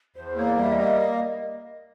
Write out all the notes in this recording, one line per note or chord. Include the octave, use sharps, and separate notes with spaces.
E2 C5
A#3 C#5
D5
G3 E5
D#5
A#3
D#5